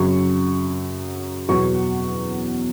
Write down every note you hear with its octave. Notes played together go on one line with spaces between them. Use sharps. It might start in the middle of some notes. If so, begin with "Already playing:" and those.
Already playing: F#2 C#3 F#3 C#6
E2 B2 F#3 C#6